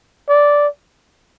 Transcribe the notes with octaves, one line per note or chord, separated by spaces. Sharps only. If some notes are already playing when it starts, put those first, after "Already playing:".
D5